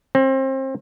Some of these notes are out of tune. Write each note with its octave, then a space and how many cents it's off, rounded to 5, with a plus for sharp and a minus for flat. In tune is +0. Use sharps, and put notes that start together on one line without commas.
C4 +30